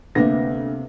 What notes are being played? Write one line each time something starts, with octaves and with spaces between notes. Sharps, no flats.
D2 C3 A#3 B3 A#6